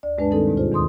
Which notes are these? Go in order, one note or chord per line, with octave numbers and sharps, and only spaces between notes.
D2 D5
G2 G#3 D4 B4 A5
D#3 G3 C4 D#4 A4 A#4
D#2 G#2 B2
F4 G#4 C5
E2 D#3 C6 D#6